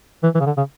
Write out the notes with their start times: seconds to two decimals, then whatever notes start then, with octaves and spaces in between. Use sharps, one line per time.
0.23 E3
0.35 E3
0.40 C#3
0.46 D3
0.57 C#3